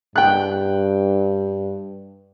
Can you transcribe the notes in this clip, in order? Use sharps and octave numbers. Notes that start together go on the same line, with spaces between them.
G2 G5 F#6